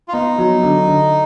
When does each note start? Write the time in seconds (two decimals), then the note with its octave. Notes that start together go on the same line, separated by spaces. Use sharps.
0.08 F4
0.13 B3 D#4
0.38 F#3
0.63 D3
0.88 D3